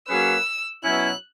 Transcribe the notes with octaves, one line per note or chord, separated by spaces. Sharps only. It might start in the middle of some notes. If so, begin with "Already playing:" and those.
F#3 A#3 C#4 G#4 B4 E6
B2 F#3 C#4 E4 F#6